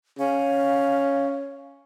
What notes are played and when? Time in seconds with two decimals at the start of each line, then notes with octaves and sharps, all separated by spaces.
0.19 C#4 F5